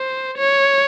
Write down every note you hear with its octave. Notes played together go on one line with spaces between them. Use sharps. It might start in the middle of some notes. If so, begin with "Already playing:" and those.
Already playing: C5
C#5